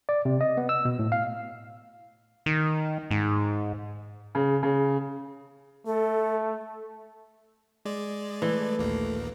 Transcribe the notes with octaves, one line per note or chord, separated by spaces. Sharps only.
D5
C3
D#5
B3
E6
B2
A2
F5
D#3
G#2
C#3
C#3
A3 A4
G#3 D5
E3 A3
A#1 D#2 A#3